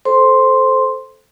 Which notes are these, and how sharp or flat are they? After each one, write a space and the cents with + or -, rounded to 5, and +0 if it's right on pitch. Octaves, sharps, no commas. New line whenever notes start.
A4 -15 C5 +0 C6 +0